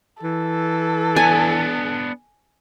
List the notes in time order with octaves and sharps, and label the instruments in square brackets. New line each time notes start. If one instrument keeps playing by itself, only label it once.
[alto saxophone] E3 [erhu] A4
[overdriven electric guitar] B3 D4 [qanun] G#5